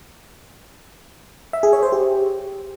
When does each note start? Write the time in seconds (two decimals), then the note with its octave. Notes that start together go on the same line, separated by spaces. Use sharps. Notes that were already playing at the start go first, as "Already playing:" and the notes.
1.53 E5
1.63 G#4
1.73 C#5
1.83 C5
1.92 G4